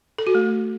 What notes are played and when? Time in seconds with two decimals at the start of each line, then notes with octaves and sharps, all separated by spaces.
0.18 A4
0.27 F#4
0.35 A3